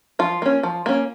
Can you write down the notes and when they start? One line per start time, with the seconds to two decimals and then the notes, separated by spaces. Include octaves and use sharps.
0.19 F3 F4
0.42 A#3 C#4
0.63 F3
0.86 A#3 C#4